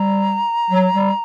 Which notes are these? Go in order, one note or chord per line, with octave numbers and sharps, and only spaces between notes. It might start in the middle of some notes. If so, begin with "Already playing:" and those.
Already playing: G3 A#5
F#3
G3